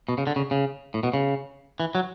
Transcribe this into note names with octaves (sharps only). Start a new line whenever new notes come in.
B2
C#3
D3
C#3
C#3
A2
B2
C#3
E3
F#3